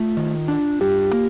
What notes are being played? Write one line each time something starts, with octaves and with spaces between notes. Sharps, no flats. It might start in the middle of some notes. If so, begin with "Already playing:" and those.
Already playing: A3 F4
D#3
D4
G2 G4
A#3